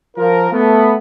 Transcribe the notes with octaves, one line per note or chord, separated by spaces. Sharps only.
F3 F4 A#4
A3 B3